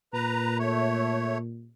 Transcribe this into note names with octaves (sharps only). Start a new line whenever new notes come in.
A#2 B4 A#5
A3 C#5